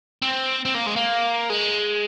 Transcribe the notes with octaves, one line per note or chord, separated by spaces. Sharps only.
C4
C4
A#3
G#3
A#3
G#3